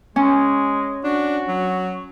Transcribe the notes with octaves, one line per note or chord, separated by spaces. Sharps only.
G#3 C#4
D4 F#4
F#3